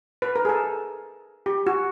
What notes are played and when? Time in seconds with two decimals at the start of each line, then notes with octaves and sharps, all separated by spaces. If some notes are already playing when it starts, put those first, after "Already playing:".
0.22 B4
0.36 A#4
0.45 G#4
0.49 A4
1.46 G4
1.67 F#4